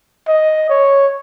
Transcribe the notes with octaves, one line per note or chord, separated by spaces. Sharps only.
D#5
C#5